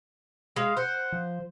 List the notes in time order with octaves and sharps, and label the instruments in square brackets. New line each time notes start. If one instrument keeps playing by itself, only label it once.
[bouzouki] G#3 [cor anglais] F5
[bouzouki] C5 [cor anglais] F#5
[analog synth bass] F3